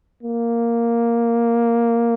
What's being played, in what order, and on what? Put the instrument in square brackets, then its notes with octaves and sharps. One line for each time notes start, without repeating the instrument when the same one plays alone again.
[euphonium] A#3